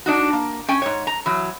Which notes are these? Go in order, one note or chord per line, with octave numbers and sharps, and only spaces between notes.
D4 D#4 F#4
A#3
C#4 G5 G#5
G#2 C#5
A#5
E3 F#3